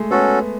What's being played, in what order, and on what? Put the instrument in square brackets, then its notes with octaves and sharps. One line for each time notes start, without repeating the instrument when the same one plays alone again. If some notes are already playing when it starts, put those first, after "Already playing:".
Already playing: [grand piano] G#3 A3
[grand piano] B3 [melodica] C#4 F#4 A4